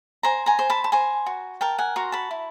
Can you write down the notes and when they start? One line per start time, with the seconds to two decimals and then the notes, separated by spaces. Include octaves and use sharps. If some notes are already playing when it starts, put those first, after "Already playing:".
0.23 C5 G#5 A#5
0.46 G#5 A#5
0.59 C5
0.70 A5 B5
0.84 A5
0.92 C5 G#5 A#5
1.26 F#4
1.61 A#4 G5 A5
1.78 F#5 G#5
1.96 F#4 A#5 C6
2.12 A5 B5
2.31 E4